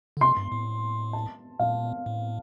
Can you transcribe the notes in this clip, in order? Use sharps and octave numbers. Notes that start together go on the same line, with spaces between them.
D3
C3 C6
G2
A2
A5
A#2 F5
A2